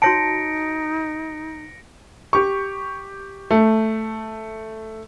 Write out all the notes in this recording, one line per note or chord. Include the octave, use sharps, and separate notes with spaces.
D#4 F#4 C#5 A5 A#6 C#7 D7
G4 C#6
A3